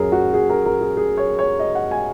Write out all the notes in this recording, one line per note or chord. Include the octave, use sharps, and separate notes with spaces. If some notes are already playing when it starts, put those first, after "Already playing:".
Already playing: F#2 F#3 C#4 G#4 A#4
F#4
G#4
A#4
A#4
G#4
G#4
C#5
C#5
D#5
F#5
G#5